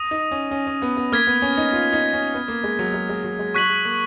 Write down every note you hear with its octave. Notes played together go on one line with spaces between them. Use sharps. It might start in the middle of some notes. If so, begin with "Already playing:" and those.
Already playing: D#6 A#6 D#7
D#4
C#4
C#4
C#4
B3
B3
A#3 F6 G#6 B6
B3
C#4
D#4
F4
D#4
C#4
B3
A#3
G#3
F#3
G#3
G#3
F#3
G#3
F#3 C#6 F#6 B6 F#7
G#3
A#3